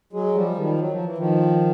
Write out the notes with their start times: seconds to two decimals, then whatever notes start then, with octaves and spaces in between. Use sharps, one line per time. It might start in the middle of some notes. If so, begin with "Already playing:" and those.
0.13 F#3 G#3
0.35 F3 G3
0.57 D#3 F3
0.79 F#3
0.92 F3
1.05 E3
1.18 D#3 F3